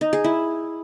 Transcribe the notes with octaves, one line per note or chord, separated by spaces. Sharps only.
D#4
G#4
E4